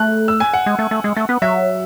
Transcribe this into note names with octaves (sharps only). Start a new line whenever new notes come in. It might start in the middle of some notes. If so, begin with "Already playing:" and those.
Already playing: A3 F#6
E6
G#5
F#5
G#3
A3
A3
G#3
A3
B3
F#3 E5